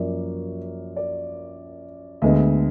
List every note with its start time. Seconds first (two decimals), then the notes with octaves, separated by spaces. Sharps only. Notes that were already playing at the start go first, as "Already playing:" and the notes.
Already playing: F#2 F3 A#3 D5
0.96 D5
2.22 D2 D3 G#3 B3 D#5